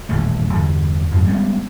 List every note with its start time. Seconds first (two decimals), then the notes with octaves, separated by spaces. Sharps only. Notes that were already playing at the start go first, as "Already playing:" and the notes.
0.09 D#1 A1 E2 A3
0.53 E2 G2 D3
1.11 F2 G#2 C#3
1.26 G3 G#3 B3 C#4